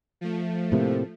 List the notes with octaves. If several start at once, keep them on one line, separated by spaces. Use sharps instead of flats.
F3 A3
A2 C3 A#3